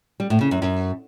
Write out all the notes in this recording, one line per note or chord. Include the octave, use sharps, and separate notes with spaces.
G3
A2
C#3
F#2
F#2